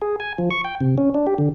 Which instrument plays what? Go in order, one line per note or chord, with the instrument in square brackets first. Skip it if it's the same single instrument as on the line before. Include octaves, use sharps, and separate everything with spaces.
[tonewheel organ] G#4
G#5
F3
C#6
G5
C3
C#4
D4
G4
D3